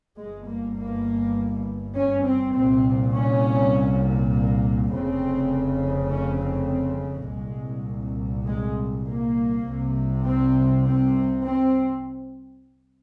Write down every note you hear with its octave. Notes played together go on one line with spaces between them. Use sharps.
G1 G2 G#3
A#3
A#3
C#4
C4
C2 A#2 C4
C#4
A#3
F1 F2 C#3 C4
C#4
C4
C4
G#3
C2 A#2
G#3
A#3
C2 C3
C4
C4
C4